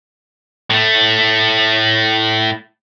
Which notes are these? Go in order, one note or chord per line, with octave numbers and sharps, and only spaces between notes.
A2 A3